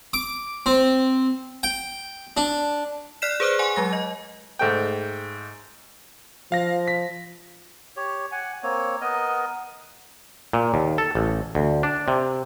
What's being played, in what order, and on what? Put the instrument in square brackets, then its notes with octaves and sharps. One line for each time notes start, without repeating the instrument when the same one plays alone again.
[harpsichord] D6
C4
G5
D4
[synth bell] D5 F6 F#6 B6 C7 E7
G#4 B4 C5 D6 F6 F#6
F#5 G#5 C6 C#6
F#3 G#3 A#6
D#5
[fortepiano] G#2 A3 G5
[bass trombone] F3 [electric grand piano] F5 A#6
[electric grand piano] B6
[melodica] G4 C#5
F#5 G#5
A#3 C4 C#5
B3 A#4 D#5
[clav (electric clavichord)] A#2
D#2
A4
A1
D2
D4
C3